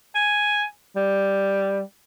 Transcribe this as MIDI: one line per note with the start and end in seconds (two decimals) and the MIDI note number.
0.15 0.66 80
0.96 1.82 55